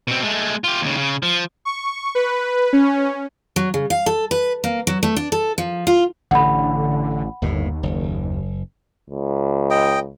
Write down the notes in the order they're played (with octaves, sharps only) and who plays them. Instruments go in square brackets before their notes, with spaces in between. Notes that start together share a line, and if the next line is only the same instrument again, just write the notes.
[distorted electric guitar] B2 C4
G#3 A3
F4 G4
D#2 C#3
C#3
F3
[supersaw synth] C#6
B4
C#4
[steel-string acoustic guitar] F#3
C#3
F5
A4
B4
A#3
F#3
A3
D4
A4
F3
F4
[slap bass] A1 [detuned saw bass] D3 [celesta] F#5 B5
[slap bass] G1 A2 [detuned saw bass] D#2
[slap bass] F#1
[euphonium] C#2
[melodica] D#5 G5